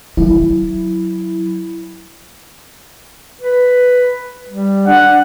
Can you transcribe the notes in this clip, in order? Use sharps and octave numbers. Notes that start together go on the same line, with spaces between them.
F#3 E4
B4
G3
D4 F#5